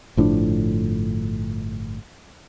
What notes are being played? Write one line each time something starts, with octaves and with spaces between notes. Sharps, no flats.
G1 A2 F3 D4